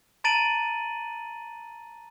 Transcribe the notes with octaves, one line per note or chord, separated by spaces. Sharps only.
A5 A#5 A6 D7 D#7 F#7